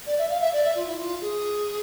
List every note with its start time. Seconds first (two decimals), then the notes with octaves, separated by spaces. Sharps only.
0.07 D5
0.18 E5
0.30 F5
0.41 E5
0.53 D5
0.64 E5
0.75 F4
0.86 E4
0.99 F4
1.21 G#4